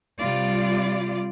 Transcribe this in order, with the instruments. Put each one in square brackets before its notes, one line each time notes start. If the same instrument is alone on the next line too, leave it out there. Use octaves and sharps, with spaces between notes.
[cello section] C3 G3 F4 D5